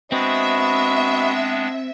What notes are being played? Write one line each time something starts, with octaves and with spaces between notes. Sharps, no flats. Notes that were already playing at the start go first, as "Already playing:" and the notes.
G#3 B3 C4 D4 F#4 B4 D#5 E5